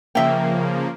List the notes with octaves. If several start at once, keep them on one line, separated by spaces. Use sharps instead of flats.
C#3 F3 A#3 E5 G5